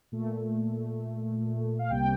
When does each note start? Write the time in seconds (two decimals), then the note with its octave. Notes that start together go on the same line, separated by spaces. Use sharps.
0.12 A#2 A3
1.79 F5
1.90 C2 C3 G3 A#3 G5